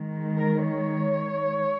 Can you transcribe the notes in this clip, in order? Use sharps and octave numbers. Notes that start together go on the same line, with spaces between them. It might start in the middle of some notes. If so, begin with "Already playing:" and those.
Already playing: D#3 G#3
A#4
C#5